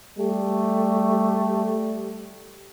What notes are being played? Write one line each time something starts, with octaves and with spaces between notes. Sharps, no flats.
G3 A3 G4